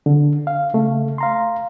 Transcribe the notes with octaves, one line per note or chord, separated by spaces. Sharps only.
D3
F5
C#3 A3
F5 A#5 C6